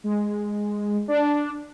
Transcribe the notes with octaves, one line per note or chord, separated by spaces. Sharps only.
G#3
D4